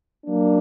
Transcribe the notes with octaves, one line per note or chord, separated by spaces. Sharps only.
F#3 A#3 D4